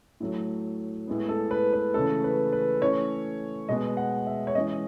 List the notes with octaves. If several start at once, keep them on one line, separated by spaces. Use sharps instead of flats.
A2 F#3 A3
A2 G#3 B3
A4
B4
B4
C#3 E3 A3 C#4 A4
B4
B4
E3 A3 C#4 C#5
B2 G#3 B3 D#5
F#5
E5
C#5
E3 G#3 C#4 D#5